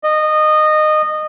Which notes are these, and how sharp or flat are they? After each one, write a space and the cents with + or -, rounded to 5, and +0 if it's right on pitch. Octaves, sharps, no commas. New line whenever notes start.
D#5 -20